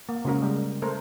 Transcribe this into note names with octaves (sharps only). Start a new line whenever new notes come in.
A#3
C#3 G#3 F#4 A#4
G3 G#3
A3 A#4 C5